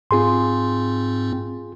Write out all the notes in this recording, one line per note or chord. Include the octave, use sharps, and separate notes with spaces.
G#2 C4 F4 G#4 C6